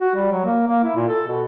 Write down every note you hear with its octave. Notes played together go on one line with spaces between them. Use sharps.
F#4
G3
F#3
A#3
A#3
E4
A#2
A4
B2